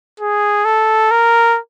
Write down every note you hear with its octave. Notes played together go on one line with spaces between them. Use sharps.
G#4
A4
A#4